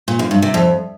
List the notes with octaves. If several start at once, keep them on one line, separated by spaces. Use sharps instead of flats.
A#2
F#2
G2
C3
F2